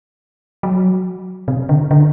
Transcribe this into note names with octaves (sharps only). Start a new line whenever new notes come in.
F#3
C3
D3
D3